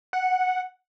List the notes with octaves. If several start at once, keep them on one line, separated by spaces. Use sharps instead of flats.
F#5